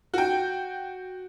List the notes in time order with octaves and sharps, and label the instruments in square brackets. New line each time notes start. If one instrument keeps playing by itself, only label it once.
[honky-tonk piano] F#4 G5